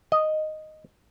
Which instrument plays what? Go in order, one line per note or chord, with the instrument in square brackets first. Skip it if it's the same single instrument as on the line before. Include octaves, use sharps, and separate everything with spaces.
[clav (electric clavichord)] D#5